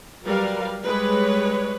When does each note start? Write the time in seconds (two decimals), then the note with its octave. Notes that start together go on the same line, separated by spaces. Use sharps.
0.24 F#3 G3 A#4 B4 F5
0.85 G3 G#3 B4 C#5